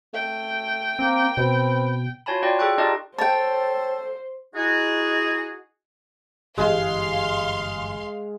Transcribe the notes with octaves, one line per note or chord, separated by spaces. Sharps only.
A3 G5
A#3 C4
B2 C4 B4
F4 F#4 C#5 G#5 A5 B5
F4 F#4 D5 G5
G#4 A4 G5 C#6 F#6
D#4 F4 G4 D5 D#5 A5
A4 C5 C#5 G5 A5
D#4 E4 F#4 G#4
G1 F#2 E3 G#3 G4 F5 C6